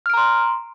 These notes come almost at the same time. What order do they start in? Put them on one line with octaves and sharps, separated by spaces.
F6 D7 A#5 C6